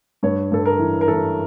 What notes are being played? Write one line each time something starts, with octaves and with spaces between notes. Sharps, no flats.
G2 C#5
G2 A4
A#4
E3
A#4
E3 A4